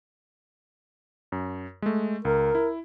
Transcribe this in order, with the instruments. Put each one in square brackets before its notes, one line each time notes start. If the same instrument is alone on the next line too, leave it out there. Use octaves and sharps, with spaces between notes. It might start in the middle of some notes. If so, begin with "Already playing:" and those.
[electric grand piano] F#2
G#3 A3
[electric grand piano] C#2 [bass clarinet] A#4
[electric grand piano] E4